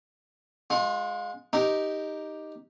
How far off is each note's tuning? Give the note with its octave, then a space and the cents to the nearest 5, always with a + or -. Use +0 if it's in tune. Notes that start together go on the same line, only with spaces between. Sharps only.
G#3 +0 F4 +30
D#4 +0 G4 +0 A#4 +0